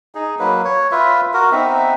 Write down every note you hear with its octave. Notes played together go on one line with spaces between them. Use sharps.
D#4 G#4
F#3 A#3 B4
C#5
F4 B4 E5
F#4 A#4
B3 C4 D#4 E5